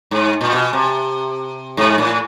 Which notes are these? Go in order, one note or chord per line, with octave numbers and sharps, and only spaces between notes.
G#2
A#2
B2
C3
G#2
A2